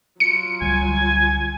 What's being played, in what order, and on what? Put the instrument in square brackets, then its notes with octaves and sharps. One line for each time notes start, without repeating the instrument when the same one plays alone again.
[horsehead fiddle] F#3 F4 [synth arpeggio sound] C#7
[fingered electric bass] C#2 D3 G3 [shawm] G#5